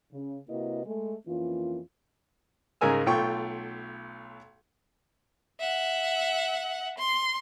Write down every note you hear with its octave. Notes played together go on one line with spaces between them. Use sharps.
C#3
C3 A#3 E4 F#4 B4 D#5
G#3 A3
F2 E3 A#3 C#4 F4
G#2 C#3 G#3 A#4 G#5 E6
B1 A3 F4 G5 C#6
E5 F#5
C6